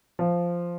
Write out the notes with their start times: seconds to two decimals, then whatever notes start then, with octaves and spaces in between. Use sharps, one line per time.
0.19 F3